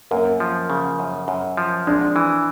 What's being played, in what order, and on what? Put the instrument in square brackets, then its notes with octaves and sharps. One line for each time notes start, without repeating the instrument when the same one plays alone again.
[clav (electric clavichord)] F#2 [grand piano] A#3
[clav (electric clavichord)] F3
C#3
F#2
F#2
F3
[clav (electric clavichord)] G#3 [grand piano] D4
[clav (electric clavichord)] E3